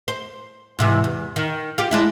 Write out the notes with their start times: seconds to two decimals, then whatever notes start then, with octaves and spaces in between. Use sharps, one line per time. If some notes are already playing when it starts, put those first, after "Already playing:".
0.08 C5
0.79 G#2 C3 E3
1.04 E2
1.36 D#3
1.78 F4 G4
1.91 G#3 D4 E4